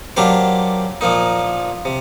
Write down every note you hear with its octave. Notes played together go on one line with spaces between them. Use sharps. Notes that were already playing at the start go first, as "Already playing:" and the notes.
F#3 A#3 D4 G4 C5
A#2 F3 A#3 D#4
C3